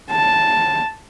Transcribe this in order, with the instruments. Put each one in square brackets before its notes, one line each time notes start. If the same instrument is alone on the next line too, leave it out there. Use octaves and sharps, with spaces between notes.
[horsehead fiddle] A5